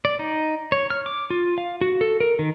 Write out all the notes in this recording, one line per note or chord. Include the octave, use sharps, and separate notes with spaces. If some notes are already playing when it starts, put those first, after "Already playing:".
D5
D#4
C#5
F6
D6
F4
F5
F#4
A4
A#4
D#3